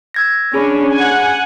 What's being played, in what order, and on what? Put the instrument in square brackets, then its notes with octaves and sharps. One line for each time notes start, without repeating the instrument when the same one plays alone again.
[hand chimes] E6 G#6 A#6
[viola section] C#4 D4 [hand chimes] G#4 B5
[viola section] F#5 G#5